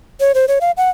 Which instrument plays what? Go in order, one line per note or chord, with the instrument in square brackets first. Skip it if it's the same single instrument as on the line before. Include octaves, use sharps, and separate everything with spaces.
[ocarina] C#5
C5
C#5
F5
F#5